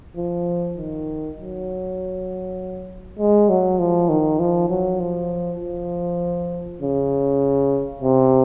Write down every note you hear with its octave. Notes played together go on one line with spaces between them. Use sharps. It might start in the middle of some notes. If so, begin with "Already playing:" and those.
F3
D#3
F#3
G#3
F#3
F3
D#3
F3
F#3
F3
F3
C#3
C3